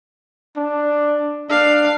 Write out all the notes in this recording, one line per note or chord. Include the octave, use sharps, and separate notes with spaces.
D4
D4 F5